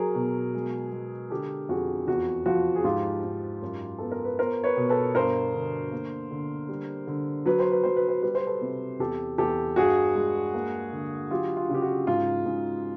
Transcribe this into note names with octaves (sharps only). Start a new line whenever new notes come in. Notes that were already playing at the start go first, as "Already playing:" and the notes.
Already playing: F#3 G#4 A#4
B2
G#3
G#3
D3 G4 A4
F2 F#4 G#4
E2 F#4
F3 F#4
G#4
G#2 F4 G4
G#2
F#2
B3 A4
A#4
B4
B3 A#4 C5
B4 C#5
B2
A4 B4
G2 A#4 C5
D3
A#3
D3
G3
D3
F#3 B4
C5
B4
F#3 C5
B4
C5
G3 B4
C5
A4 B4
C3
E2 G4 A4
E2 G4 A4
G2 F#4 G#4
G#3
A#3
D3
F#3 F4 G4
F4
C#3 G4
F#4
G#2 F4
G#2